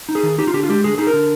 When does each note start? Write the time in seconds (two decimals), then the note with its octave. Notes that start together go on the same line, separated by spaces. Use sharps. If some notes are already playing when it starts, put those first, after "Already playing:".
0.09 D#4
0.15 G#4
0.23 D#3
0.38 D#4 G4
0.47 F4
0.54 D3 G4
0.63 F4
0.69 G#3 G4
0.84 D3 G#4
0.98 D#4 G#4
1.07 A#4
1.13 D3